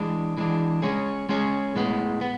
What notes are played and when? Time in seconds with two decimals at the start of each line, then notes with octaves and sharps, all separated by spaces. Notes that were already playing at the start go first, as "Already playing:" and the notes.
Already playing: E3 G#3 D4
0.37 E3 G#3 D4
0.82 G#3 C#4 G#4 C#5
1.29 G#3 C#4 G#4 C#5
1.76 A2 G#3 B3
2.21 B3